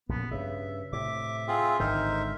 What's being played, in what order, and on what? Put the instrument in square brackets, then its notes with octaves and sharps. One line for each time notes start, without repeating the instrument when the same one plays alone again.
[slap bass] A#1 F#2 [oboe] B3
[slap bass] G2 C#3 [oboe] E5
[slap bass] A2 C3 [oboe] E5 [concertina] D6
[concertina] C4 F4 G#4
[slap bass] G#1 G#2 D3 [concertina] D#4 A#4 C5 [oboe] E5